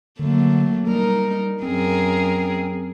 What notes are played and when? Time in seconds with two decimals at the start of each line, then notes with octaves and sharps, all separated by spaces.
0.19 D3 F#3 A3 A#3
0.88 G3 D#4 A#4
1.62 F#2 C4 G#4 A#4